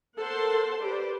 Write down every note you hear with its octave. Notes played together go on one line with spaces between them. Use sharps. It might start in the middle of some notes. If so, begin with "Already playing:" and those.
A4 A#4 C5 F#5 A5 C6
G4 B4 C5 D5